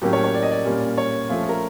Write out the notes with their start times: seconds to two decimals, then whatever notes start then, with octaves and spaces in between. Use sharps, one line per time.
0.02 A2 F#3 A#3 C#4 G4
0.13 C#5
0.24 C#5
0.34 D5
0.43 D#5
0.51 D5
0.65 A#2 G3 A#3 C#4
0.98 C#5
1.29 F3 A3 C#4 F4
1.49 A#4